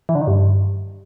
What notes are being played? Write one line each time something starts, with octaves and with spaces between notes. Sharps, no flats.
E3
D3
D#3
G2